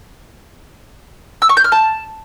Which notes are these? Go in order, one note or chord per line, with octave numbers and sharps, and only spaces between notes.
E6
C#6
G6
F6
A5